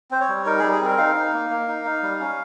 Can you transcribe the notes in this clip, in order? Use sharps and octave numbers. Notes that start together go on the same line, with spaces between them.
C4 C5
C#5
G3
D#4 A#4
G3 G#4
G#4
C4 A#4
D#4 F5
D#4
A#3
A#3
D#4
D#4
G3
C#4